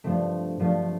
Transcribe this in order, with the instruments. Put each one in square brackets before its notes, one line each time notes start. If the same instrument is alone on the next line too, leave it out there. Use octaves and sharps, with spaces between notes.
[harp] G2 F3 A3 C4
G2 F3 A3 F4